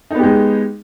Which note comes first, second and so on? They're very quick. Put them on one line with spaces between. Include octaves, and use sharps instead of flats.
D#4 B3 G4 G#3